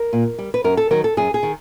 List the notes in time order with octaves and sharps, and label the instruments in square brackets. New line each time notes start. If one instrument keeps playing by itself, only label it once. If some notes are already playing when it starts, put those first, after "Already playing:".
Already playing: [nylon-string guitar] A#4
A#2
G3
B4
F#2 A#4
A4
D#3 F#3 A#4
A4
F#2 G#4
G#4
D#3